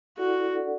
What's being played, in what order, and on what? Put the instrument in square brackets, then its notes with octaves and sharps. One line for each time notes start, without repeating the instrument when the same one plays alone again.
[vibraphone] E4 A4 D5 F#5 [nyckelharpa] F#4
[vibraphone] D4 A4 D5 F#5